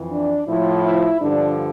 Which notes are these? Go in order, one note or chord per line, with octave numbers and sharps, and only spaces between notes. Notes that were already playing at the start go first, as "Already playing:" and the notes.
Already playing: F2 E3
D4
A2 F3 E4
E4
G2 D3 F3 D4